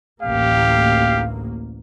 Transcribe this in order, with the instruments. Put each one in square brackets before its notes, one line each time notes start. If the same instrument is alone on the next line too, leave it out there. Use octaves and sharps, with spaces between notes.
[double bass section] A1 D2 A#3 [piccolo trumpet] G4 [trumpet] F5